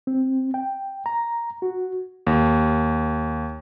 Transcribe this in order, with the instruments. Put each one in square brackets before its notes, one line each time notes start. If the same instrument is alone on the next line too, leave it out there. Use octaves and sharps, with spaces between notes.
[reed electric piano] C4
G5
A#5
F#4
[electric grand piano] D#2